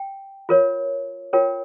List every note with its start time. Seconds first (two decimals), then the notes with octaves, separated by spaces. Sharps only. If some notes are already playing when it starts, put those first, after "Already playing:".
Already playing: G5
0.49 F4 A#4 C#5
1.33 F4 A#4 C#5 G5